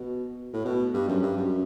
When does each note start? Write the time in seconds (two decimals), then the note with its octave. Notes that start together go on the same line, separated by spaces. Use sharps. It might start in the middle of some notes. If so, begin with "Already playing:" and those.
Already playing: B2
0.54 A2
0.65 B2
0.94 G2
1.08 F#2
1.23 G2
1.37 F#2